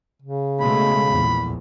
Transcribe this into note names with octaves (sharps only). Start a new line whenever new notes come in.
C#3
B2 G#3 A3 B5
A#1 E2